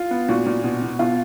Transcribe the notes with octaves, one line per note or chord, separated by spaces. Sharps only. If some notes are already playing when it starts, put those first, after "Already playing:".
Already playing: F4
B3
A#2 F#4
A#2
B2
B2
B2 F4